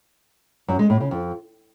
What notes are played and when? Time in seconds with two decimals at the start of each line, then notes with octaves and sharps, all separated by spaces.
0.68 F#2
0.79 G#3
0.90 A2
1.00 C#3
1.11 F2